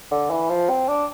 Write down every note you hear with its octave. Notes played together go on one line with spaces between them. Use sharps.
D3
E3
F3
C4
D4